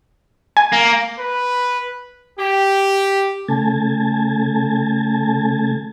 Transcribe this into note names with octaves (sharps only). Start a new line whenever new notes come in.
G#5
A#3
B4
G4
C#3 A3 G#5 A5